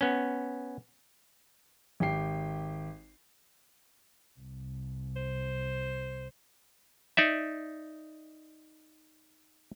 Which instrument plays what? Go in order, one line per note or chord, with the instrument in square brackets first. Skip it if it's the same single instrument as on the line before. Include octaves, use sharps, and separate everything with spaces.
[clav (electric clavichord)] B3 C#4
[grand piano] G#1 G4 G5 C7
[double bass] C2
[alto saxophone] C5
[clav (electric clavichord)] D#4 D5 E5